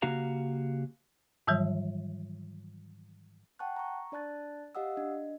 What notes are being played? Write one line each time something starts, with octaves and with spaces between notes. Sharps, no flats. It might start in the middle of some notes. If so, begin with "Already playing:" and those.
C#3 A#3 F#4 G4 F5 A#5
G#2 D#3 E3 F#3 G3
F#5 G5 A5 C#6 F#6
A#5 C#6
D4 D5 A5 F#6 A6
G4 D#5 F5 F#5 D#6 E6
D4 D#5